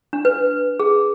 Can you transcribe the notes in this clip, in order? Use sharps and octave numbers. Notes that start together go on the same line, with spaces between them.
D4
B4
G#4